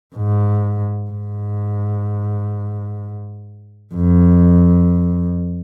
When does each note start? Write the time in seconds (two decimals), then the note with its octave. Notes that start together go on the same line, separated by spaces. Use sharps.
0.16 G#2
1.10 G#2
3.94 F2